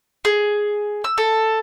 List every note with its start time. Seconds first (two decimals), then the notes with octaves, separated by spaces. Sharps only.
0.25 G#4
1.04 E6
1.18 A4